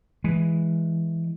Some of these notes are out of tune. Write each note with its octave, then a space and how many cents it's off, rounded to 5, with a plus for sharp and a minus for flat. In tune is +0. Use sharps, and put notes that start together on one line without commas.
E3 +0 G#3 +0